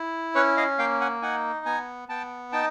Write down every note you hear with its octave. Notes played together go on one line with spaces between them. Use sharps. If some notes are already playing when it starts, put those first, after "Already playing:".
Already playing: E4
C#4 B4 C#5
D#5 F5
A#3 F5 G5
F#5 G#5
D#4 F#5 G#5
B3 G#5 A#5
B3 G5 A5
D#4 G5 A5